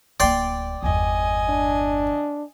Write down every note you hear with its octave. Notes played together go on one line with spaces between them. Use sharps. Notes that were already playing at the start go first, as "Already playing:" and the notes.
D1 A#3 D5 G5 C6
G1 E2 D#5 G#5
D4